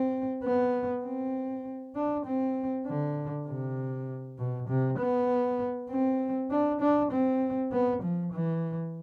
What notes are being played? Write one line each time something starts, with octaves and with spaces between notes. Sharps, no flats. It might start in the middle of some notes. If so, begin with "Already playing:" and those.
Already playing: C4
B3
C4
D4
C4
D3
C3
B2
C3
B3
C4
D4
D4
C4
B3
F3
E3